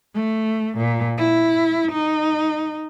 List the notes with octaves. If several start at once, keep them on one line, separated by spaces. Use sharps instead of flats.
A3
A#2
E4
D#4